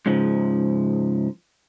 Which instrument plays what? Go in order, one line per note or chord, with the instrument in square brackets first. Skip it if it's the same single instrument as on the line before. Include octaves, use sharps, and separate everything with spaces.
[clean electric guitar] G#2 C#3 F3